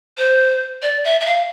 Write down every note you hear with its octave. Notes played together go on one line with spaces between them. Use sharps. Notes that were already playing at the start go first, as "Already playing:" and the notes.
C5
D5
E5
E5
F5